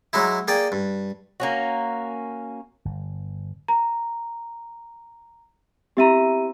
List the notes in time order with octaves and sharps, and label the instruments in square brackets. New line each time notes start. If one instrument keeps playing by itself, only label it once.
[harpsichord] F#3 G#3 D#4 E4
A#3 G#4 D5 G5
G2
[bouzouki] A#3 C#4 F#4
[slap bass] G1
[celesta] A#5
[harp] C4 E4 A#5 [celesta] G4 E5 D#7